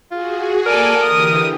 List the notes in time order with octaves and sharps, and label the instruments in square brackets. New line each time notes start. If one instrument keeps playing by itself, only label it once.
[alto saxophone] F4 [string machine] F#4 G#4
[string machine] A#3 F#6 G#6 [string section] A4 D5 G#5 [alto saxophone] A#4
[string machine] D3 E3 G4 [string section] D#6